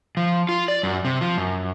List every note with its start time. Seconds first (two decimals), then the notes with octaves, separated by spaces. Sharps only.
0.17 F3
0.49 F4
0.68 D5
0.83 F#2
1.05 C3
1.21 F3
1.38 F#2